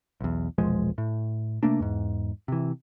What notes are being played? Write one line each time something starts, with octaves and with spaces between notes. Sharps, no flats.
B1 E2
E1 A#1 F3 G#3
A2
C3 A3 A#3 D4
E2 G#2
C3 E3